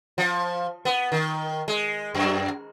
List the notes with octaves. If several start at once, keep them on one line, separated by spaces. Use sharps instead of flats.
F3
B3
D#3
G#3
F#2